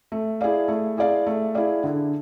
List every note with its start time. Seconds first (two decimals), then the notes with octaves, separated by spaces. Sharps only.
0.12 A3
0.41 E4 G#4 D5 F5
0.68 A3
0.97 E4 G#4 D5 F5
1.27 A3
1.54 E4 G#4 D5 F5
1.84 D3